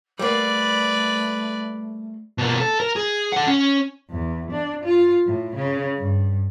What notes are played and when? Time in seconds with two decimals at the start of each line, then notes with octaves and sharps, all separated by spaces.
0.19 G3 A3 A#3 B4 D5
2.38 B2 A#3
2.60 A4
2.80 A#4
2.96 G#4
3.32 A4 F#5
3.47 C#4
4.10 E2
4.51 D4
4.84 F4
5.25 A2
5.55 C#3
5.99 G2